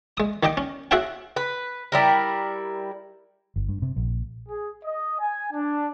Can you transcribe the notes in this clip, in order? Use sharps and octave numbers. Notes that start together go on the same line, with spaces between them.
G#3 D#6
D#3 G4 D#5 G5
C#4
F#4 G#4 C#5 E5 F5 G5
B4
G3 E4 A#4
G1
G2
C3
A#1
G#4
D#5
G#5
D4